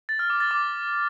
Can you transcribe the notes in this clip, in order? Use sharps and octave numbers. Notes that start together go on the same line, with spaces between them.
A6
F6
D6
A6
D6